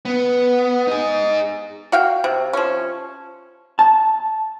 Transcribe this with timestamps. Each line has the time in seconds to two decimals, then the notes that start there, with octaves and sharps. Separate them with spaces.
0.05 B3
0.87 D#4 G#4
1.92 F#4 F5 G5
2.24 C3
2.53 F3 C#4
3.79 A5